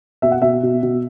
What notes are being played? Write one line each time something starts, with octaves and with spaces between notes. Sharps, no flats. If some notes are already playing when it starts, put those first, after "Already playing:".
B2 E5
F#5
B2 E5
B2
B2